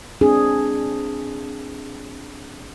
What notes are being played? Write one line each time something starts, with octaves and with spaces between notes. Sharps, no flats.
C4 D4 G#4